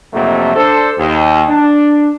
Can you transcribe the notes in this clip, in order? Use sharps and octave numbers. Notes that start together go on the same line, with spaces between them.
A#1 F2 C3 F#3 A3 A#3
D4 A4 C5
D#2
D4